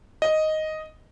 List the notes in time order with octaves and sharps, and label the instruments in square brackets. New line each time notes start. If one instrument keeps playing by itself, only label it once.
[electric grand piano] D#5